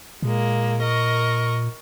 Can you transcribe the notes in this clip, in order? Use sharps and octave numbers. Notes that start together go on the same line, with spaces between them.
A#2 G#3 A#3
A#4 D#5 C#6